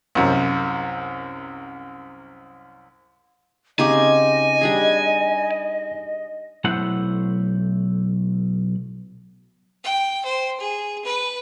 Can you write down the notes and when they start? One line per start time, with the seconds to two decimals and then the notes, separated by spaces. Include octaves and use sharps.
0.15 C2 F#2
3.79 C#3 C4 D#4 G4 D#5 G#5 D6
4.61 G3 D4 G#4
6.64 B1 A3 E4 C5 F#5
9.84 G5
10.25 C5
10.60 G#4
11.04 B4